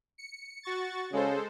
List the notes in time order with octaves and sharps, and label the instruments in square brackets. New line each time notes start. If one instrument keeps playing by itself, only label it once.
[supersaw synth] C#7
F#4 C#6 A6
[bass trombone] C#3 [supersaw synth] G#3 A4 C5